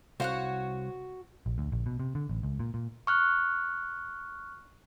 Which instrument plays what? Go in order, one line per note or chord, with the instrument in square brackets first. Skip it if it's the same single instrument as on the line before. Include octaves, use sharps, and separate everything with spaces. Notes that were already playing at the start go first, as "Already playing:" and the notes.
[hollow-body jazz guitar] C2 F5 [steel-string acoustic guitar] F#4 [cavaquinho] C5 C#5 F#5
[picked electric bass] A#1
D2
A#1
B2
C3
D3
A1
C#2
A#2
A#2
[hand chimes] C#6 F6 F#6